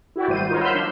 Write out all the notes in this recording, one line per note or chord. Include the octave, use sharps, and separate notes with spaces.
E4 F#4 G4 D5
G#1 G3 C5 D#7
D#4 F4 A#4 C#5
F#5 B5 C6 E6 F6 G6
F3 D4 E6